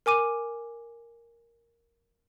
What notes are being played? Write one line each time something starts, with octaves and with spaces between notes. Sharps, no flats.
A#4 G#5 D6 D#7